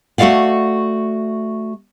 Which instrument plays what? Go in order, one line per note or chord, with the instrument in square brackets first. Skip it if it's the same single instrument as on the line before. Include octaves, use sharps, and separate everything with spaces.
[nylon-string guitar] A3 F#4 G4 D5 F5 F#5